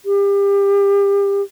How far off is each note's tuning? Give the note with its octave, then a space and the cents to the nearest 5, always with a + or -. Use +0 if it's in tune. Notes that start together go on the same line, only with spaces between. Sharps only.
G4 +30